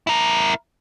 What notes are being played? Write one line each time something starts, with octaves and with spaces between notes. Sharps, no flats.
E4 A#4